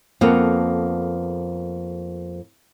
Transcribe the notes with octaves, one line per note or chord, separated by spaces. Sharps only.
F2 A#3 B3 A4 F5